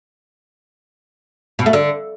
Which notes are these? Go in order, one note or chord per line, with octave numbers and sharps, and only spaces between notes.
B2
A3
D3